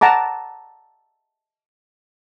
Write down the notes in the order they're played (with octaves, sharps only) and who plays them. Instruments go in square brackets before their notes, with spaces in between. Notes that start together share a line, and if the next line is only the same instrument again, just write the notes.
[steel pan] F#5 A5 A#5 D6